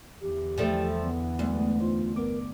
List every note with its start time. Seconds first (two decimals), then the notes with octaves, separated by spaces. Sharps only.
0.21 E2 D3 E3 G4
0.58 F3 G3 A3
1.03 B3
1.39 D2 F#3 G#3
1.80 B3 D#4 F4 C5
2.16 G1 B3 A#4 D6